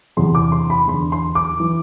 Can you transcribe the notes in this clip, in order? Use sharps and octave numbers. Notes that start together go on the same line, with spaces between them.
E2 C3 E3 C6
D6
C6
B5
E2 D3 C6
C6
D6
E3